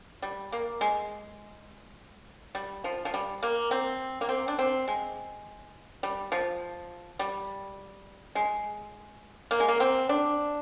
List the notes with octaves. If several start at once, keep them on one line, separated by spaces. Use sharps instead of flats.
G3
A#3
G#3
G3
F3
F3
G3
A#3
C4
A#3
C4
D4
C4
G#3
G3
F3
G3
G#3
A#3
G#3
A#3
C4
D4